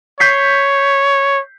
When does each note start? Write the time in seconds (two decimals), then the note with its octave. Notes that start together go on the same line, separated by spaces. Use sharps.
0.20 C#5 G6 B6 C7